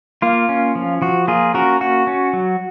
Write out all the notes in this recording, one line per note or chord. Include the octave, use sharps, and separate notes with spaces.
A#3 F4
C#4
F3
F3 F#4
A#3 F4 G#4
C#4 F#4 A#4
A#3 F#4
C#4
F#3